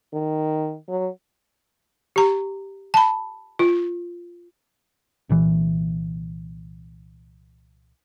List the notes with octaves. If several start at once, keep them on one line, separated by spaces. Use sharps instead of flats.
D#3
F#3
G4 A#5
A5 B5
F4
C2 A#2 E3